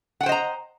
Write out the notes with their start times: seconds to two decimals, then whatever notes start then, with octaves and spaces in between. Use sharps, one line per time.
0.21 F#5
0.23 G5
0.26 C5
0.29 D#5
0.32 A#5